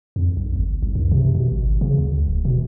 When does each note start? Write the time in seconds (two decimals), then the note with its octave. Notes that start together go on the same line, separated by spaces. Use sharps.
0.16 F2
0.37 B1
0.56 G1
0.82 C2
0.95 F#2
1.11 C3
1.35 B2
1.52 G#1
1.81 C#3
1.98 D2
2.28 D1
2.45 B2